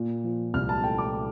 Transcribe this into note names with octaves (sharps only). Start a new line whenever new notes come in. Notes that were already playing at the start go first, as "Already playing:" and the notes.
Already playing: A#2
F3
C2 F6
A5
A3 G5
D6